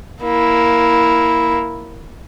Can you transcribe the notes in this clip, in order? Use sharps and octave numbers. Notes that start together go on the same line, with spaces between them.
A#3 E4